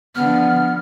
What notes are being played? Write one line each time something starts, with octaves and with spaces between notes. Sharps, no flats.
D3 F3 B3 F6